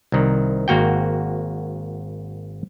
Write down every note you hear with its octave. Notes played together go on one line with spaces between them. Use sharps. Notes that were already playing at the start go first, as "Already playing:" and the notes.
C2 D#3
G#1 A#3 F#4 G5